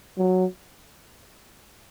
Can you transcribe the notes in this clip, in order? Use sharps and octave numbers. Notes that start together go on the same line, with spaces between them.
F#3